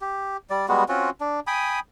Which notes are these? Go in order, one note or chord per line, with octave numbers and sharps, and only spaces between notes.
G4
G3 D5
G3 G#3 B3 F#4
C4 C#4 F4 F#4
D4
G5 G#5 B5 D#6